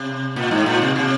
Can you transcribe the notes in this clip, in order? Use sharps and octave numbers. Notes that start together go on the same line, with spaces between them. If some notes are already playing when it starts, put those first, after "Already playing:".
Already playing: C3
A#2
G#2
A#2
C3
C3